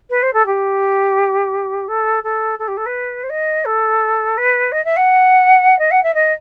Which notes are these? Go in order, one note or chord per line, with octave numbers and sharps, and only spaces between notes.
B4
C5
A4
G4
A4
A4
A4
G4
A4
B4
C5
D#5
A4
B4
D#5
E5
F#5
D#5
F#5
E5
D#5